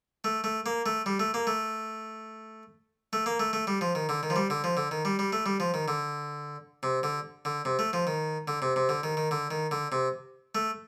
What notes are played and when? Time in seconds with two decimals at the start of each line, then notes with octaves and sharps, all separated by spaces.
0.24 A3
0.44 A3
0.66 A#3
0.86 A3
1.06 G3
1.20 A3
1.34 A#3
1.47 A3
3.13 A3
3.26 A#3
3.40 A3
3.53 A3
3.67 G3
3.81 F3
3.95 D#3
4.09 D3
4.23 D#3
4.30 F3
4.36 G3
4.50 D3
4.64 F3
4.77 D3
4.91 D#3
5.05 G3
5.19 G3
5.33 A3
5.46 G3
5.60 F3
5.74 D#3
5.88 D3
6.83 C3
7.03 D3
7.45 D3
7.65 C3
7.79 A3
7.93 F3
8.07 D#3
8.48 D3
8.62 C3
8.76 C3
8.89 D3
9.03 D#3
9.17 D#3
9.31 D3
9.51 D#3
9.71 D3
9.92 C3
10.55 A3